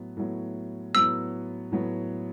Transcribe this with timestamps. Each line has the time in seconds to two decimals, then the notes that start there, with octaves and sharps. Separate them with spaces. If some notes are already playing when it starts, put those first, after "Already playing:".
Already playing: A2 F#3 B3
0.17 A2 F#3 B3
0.94 A2 F#3 B3 E6
1.71 A2 F#3 B3